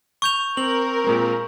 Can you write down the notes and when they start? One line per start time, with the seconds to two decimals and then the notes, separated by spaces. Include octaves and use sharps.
0.22 C#6 G6 F7
0.57 C4 A#4 F#7
1.04 A#2 G#3 C4